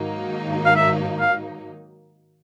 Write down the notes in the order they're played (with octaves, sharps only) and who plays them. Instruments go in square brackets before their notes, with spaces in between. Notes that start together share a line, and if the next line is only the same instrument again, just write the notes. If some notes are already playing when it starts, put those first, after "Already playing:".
Already playing: [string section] G#2 D#3 F#3 A#3 D#4
[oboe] F5
E5
F5